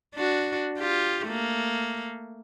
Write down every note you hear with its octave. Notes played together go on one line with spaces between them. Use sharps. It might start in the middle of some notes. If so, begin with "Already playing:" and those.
D4 F#4
F4 G4
A3 A#3